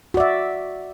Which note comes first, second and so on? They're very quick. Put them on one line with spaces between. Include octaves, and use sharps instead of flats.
F#4 D5 E5